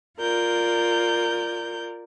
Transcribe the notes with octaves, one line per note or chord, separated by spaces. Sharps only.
F4 A#4 D5 G6